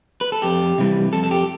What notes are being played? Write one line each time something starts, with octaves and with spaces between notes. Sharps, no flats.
B4
A4
F2 G4
C3 E3 G3
F2 A4
A4
G4